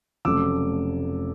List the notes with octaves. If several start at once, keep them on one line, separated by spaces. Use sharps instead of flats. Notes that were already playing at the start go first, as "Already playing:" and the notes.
F1 F2 C#3 F#3 A3 D6 E6